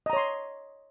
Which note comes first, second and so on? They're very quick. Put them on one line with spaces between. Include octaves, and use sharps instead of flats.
D#5 A#5 C#5 C6